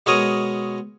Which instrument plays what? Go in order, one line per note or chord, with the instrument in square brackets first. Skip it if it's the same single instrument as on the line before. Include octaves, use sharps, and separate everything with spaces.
[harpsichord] B2 G#3 A#4 C#5 D#6